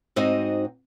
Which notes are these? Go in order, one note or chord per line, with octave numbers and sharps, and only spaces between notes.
G#2 C4 D#4 F#4 C5 D#5